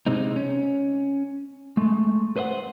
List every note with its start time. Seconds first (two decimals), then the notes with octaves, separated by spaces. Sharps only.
0.07 C3 G#3 C4 D#4
0.36 C#4
1.77 G#3 A3
2.36 B4 C5 D#5 F#5